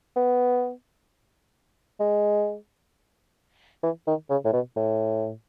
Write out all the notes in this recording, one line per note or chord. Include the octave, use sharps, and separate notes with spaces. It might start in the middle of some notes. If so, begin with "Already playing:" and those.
B3
G#3
E3
D#3
C#3
A2
B2
A2